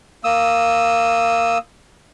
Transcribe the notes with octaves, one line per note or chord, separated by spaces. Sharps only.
A#3 D#6 E6